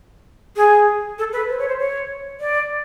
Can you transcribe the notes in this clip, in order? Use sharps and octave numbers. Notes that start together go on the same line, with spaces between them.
G#4
A4
B4
C5
C#5
C5
C#5
D5